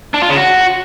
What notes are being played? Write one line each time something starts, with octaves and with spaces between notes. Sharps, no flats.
D4
F4
C#3
F#4